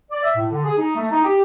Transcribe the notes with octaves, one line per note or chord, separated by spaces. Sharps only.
D5
E5
A2
D3
G#4
D#4
A3
D#4
G4